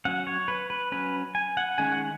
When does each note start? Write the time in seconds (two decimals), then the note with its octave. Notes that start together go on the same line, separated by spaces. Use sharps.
0.05 F#3 C#4 F#5
0.27 C#5
0.48 B4
0.70 B4
0.92 F#3 C#4 B4
1.35 G#5
1.57 F#5
1.78 D#3 G#3 C#4 G#5
1.92 F#5